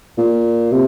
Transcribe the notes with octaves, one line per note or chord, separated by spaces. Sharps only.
A#2
C3